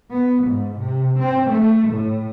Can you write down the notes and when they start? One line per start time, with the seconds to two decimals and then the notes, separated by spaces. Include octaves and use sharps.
0.11 B3
0.44 G#2
0.79 C3
1.19 C4
1.50 A3
1.90 A2